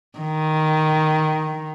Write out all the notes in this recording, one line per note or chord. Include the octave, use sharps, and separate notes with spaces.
D#3